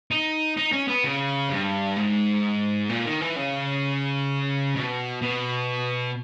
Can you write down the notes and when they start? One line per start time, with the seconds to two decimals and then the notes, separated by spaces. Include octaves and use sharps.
0.11 D#4
0.57 D#4
0.72 C#4
0.88 B3
1.04 C#3
1.50 G2
1.96 G#2
2.89 A#2
3.06 D#3
3.21 E3
3.36 C#3
4.75 B2
5.22 B2